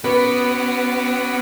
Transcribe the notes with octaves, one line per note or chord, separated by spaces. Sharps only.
B3 C#4 F#4 B4 D6